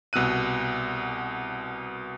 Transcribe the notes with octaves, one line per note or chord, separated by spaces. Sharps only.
C2 B2 E6 F#6 D#7